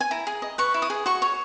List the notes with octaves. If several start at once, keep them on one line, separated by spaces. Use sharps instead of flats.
G#5
E4 A#5
G#4
D#5
B4 C#6
E4
D#6
G#4
F#4 C#6
C#5